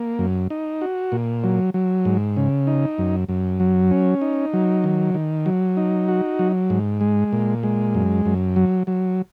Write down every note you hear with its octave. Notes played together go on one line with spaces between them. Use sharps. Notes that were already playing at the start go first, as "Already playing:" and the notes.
Already playing: A#3
F#2
D#4
F#4
A#2
F#3
F#3
G#2
C#3
D#4
F#2
F#2
F#3
C#4
D#4
F#3
D#3
D#3
F#3
D#4
F#4
F#3
G#2
G#3
A#2
G#3
F#2
F#2
F#3
F#3